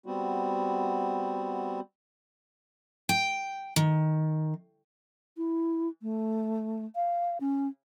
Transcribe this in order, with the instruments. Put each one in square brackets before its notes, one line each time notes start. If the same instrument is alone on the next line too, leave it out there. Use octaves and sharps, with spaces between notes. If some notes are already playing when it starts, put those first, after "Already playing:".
[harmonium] G3 B3 C4 F#4
[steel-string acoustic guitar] G5
D#3
[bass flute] E4
A3
F5
C#4